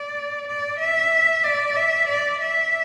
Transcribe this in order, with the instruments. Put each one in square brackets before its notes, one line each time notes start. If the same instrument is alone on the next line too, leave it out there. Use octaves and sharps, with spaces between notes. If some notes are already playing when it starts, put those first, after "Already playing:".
Already playing: [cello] D5
D5
E5
D5
E5
D5
E5